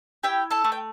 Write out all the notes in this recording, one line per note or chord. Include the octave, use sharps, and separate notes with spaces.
E4 G4 G5
A4 A5
A3
G5